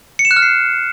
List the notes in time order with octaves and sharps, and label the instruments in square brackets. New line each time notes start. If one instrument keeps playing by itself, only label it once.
[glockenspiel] C#7
E7
F#6
F6
C7